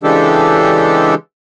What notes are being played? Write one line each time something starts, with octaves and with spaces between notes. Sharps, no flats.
C#3 E3 G#3 D4 G4 A4